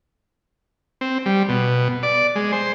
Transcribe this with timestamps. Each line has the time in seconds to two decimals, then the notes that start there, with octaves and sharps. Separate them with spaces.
1.01 C4
1.26 G3
1.49 B2
2.03 D5
2.36 G#3
2.52 C5